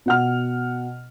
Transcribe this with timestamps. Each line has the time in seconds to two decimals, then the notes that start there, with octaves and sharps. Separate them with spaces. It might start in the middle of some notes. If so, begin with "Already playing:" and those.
0.06 B2 F#5 F6